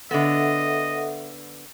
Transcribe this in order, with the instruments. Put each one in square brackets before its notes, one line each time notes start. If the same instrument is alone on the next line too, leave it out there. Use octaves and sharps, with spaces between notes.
[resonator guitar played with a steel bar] D3 B3 [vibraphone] A4 E5 F#5 [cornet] D#5